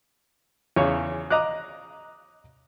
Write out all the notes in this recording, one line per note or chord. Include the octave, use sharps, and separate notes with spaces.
E2 C#3 C#5 C#6
D#5 A#5 D6 F#6